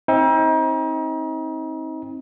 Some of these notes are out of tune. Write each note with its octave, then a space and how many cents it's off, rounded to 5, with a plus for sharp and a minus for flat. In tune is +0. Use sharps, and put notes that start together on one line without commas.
C4 +25 D#4 +35